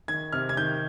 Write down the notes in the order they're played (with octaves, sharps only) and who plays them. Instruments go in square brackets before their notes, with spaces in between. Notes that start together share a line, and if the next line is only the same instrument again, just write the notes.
[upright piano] D#3 G#6
C3 F6
G#6
D#3 G6